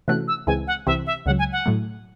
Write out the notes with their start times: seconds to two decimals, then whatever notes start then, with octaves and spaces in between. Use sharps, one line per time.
0.08 C3 E3 A3 C#4 F#4 F#6
0.28 E6
0.47 C#2 C#3 E3 G#3 C4 G#5
0.67 F#5
0.87 C2 C3 E3 C4 E5
1.06 E5
1.26 C#2 C#3 F#3 F#5
1.39 G#5
1.52 F#5
1.66 A2 F#3 A3